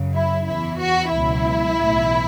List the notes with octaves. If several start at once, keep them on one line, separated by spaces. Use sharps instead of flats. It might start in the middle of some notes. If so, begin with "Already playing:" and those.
Already playing: F#2 C#3 F#3
E4
E2 E3 E4
F#4
C#2 B2 F#3 E4
B1 A2 E3